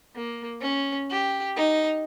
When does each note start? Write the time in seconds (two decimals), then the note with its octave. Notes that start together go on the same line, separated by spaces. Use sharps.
0.16 A#3
0.61 C#4
1.10 G4
1.56 D#4